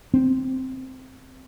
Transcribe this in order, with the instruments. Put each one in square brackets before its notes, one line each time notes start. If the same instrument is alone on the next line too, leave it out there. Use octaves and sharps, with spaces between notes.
[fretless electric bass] C4